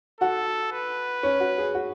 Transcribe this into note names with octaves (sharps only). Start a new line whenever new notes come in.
F#4 A4 F#5
B4
C#4 C#5
F#4
G#4
F#4